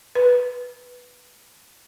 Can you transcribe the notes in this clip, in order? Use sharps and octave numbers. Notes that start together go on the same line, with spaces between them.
B4